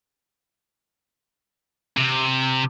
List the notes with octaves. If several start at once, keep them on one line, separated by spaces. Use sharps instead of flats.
C3